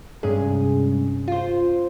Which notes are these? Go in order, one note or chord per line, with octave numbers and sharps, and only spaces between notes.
G2 C3 G#3 C#4 G#4
F4 C5